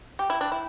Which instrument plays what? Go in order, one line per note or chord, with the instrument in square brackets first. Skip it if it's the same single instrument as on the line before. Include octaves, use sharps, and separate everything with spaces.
[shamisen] G4 [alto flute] G5
[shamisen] E4
D4
E4